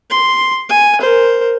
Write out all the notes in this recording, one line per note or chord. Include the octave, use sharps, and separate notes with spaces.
C6
G#5
A#4 C5